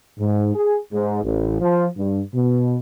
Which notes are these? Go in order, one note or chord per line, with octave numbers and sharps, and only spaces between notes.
G#2
G#4
G#2
A1
F3
G2
B2